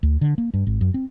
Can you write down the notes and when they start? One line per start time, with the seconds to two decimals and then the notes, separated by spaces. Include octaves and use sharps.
0.03 D2
0.21 D3
0.38 A#3
0.54 G2
0.67 G#1
0.81 F#2
0.94 C4